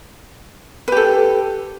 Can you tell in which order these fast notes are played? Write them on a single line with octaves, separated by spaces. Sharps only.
B4 G4 A4